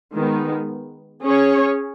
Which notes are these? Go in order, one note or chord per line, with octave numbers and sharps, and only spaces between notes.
D#3 G#3 B3
C#4 G#4 C#5